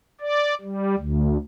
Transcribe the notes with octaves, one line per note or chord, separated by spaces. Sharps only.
D5
G3
D2